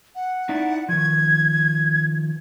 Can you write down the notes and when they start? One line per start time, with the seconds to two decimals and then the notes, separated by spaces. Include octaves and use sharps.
0.16 F#5
0.49 D#4 E4 D5
0.89 D#3 F3 G#6